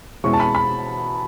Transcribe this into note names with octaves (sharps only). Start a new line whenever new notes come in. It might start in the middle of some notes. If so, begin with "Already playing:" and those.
B2 G#3 C#4 E4 C#6
A5
B5
B5